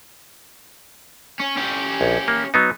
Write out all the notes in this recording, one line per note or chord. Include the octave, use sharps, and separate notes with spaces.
C#4
C#4 G4
A#1
A#3
F#3 B3 D#4